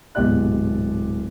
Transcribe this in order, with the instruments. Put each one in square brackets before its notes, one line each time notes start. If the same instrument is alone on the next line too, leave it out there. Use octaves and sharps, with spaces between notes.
[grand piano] D1 G#2 B2 G4 D5 F#6